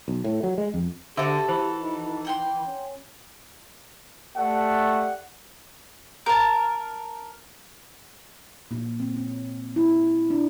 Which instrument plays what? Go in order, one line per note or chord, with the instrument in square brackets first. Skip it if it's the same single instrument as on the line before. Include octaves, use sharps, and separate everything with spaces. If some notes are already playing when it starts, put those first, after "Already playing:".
[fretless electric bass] B1
A2
F#3
G#3
F2
[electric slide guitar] D3 [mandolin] F#4 A4 [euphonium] G4 [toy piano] C5 E5 D6
[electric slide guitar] E3 [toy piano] C5
[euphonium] D#4
[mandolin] F#5 G5 C6
[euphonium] C#4
[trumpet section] A3 [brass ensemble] G4 D5 F#5
[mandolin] A#4 A5
[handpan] A#2
C4
C#4
E4
D4